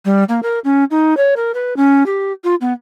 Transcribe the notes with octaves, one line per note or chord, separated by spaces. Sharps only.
G3
A#3
A#4
C#4
D#4
C#5
A#4
B4
C#4
G4
F4
B3